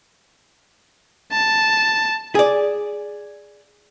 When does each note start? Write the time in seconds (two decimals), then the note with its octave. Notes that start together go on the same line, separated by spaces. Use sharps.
1.32 A5
2.35 G#4 D5